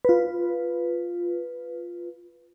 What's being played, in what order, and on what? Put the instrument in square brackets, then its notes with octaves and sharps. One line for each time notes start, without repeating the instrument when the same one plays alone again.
[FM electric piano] F4 B4